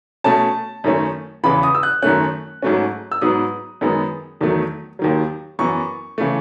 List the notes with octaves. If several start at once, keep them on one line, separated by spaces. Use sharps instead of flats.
B2 A3 C#4 A5
F#2 D#3 A3 C#4
E2 C#3 E3 B3 B5
D#6
E6
F#6
F#2 D#3 A3 C#4 F#6
G#2 F#3 A3 C#4
E6
G#2 F#3 B3 D#6
F#2 D#3 G#3 B3
E2 D#3 F#3 A3
D#2 D#3 F#3
F#2 E3 B3 C#6
C#3 E3 A3